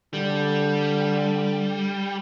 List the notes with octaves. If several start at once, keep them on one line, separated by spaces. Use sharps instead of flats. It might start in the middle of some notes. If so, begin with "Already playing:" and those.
D3 G3